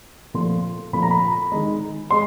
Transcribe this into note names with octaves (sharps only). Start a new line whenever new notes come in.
A#2 F3 A3 C6
A#2 F3 A3 B5
A#5
B5
D#3 G#3
G#3 C6